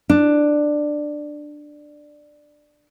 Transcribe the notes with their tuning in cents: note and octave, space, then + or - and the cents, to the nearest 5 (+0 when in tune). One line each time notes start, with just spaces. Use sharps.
D4 +10